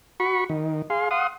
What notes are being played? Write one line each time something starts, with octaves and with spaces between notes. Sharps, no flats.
F#4 B5 C#6
D#3
G#4 F5 C6
F5 F#5 C6 D#6